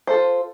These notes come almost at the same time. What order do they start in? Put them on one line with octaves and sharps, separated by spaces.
C5 A4 F4